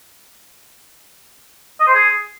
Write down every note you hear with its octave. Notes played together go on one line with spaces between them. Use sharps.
D#5
C5
G#4